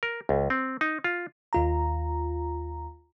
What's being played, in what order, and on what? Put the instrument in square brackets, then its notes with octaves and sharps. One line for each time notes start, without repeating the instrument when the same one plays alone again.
[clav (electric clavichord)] A#4
C#2
C4
D#4
F4
[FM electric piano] D#2 F4 A#5